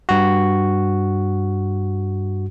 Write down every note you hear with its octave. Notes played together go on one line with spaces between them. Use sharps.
G2 F#4